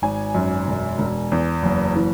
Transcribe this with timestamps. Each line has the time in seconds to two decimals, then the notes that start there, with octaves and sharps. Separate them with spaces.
0.02 G#1 G#5
0.35 F#2
0.67 E1
0.98 E1
1.32 E2
1.63 F#1
1.96 E3